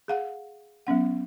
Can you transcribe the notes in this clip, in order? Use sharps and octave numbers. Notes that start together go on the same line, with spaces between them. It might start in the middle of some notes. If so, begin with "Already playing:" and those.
G#4 F5 F#5
F#3 B3 C#4 F#5